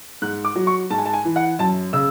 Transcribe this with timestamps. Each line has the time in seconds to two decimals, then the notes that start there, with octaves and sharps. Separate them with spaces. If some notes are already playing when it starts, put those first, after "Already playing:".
0.22 G#2 F#6
0.45 D6
0.56 F#3
0.67 C#6
0.90 G#2 A5
0.98 G#5
1.06 A5
1.14 G#5
1.25 E3
1.36 F#5
1.59 F#2 A5
1.93 C#3 E6